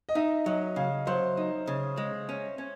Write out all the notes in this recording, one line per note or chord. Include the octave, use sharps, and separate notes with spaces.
D#5
D#4 E5
F#3 D#5
C#3 F5
F#3 C5
D#4
C#3
G#3
C#4
C#4